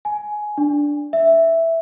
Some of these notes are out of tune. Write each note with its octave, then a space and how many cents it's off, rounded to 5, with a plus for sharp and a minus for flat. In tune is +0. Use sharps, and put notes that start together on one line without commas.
G#5 +15
D4 -5
E5 +0